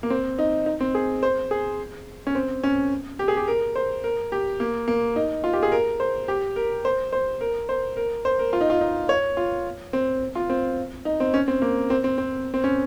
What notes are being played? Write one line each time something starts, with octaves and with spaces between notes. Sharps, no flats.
A#3
C4
D#4
D#4
C4
G#4
C5
G#4
C#4
C4
C#4
G4
G#4
G4
A#4
C5
A#4
G4
A#3
A#3
D#4
F4
G4
G#4
A#4
C5
G4
A#4
C5
C5
A#4
C5
A#4
C5
A#4
F4
D#4
F4
D#4
C#5
F4
C4
F4
C4
D#4
C4
C#4
C4
A#3
C4
C4
C4
C4
C#4